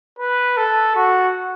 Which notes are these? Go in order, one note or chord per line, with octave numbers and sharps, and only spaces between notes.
B4
A4
F#4